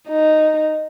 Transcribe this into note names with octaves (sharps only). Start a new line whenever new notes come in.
D#4